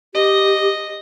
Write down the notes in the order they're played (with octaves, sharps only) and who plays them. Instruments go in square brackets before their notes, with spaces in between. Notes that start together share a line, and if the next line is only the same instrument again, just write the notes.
[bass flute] G4 [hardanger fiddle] D#5